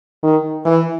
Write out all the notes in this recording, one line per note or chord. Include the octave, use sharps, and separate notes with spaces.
D#3
E3